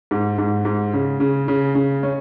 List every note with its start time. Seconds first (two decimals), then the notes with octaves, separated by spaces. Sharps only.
0.11 G#2
0.38 G#2
0.65 G#2
0.93 C#3
1.20 C#3
1.48 C#3
1.75 C#3
2.03 C#4